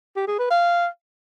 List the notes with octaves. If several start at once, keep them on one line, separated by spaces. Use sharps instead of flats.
G4
G#4
B4
F5